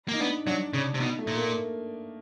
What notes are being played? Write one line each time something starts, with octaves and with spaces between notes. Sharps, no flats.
A#3 D#4
B3 D4
F#3 D4
C#3
C3
B2 D#4
A3
A#2
A#3